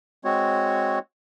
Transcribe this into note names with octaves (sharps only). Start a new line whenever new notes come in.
G#3 C4 F#4 C#5